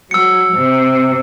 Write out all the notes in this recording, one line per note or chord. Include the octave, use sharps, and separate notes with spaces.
F#3 E6 C#7
C3